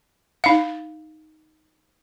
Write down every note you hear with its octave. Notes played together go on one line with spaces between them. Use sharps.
D#4 F5